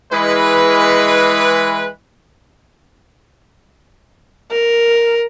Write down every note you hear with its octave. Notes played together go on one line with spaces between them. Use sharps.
E3 G#3 B4
A#4